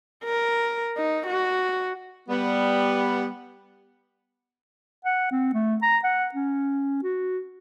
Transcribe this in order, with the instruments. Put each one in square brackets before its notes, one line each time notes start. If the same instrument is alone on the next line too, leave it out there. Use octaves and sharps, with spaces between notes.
[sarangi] A#4
D#4
F#4
[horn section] G3 B3
[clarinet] F#5
C4
A3
A#5
F#5
C#4
F#4